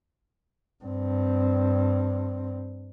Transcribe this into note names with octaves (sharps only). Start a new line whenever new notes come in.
G2 C4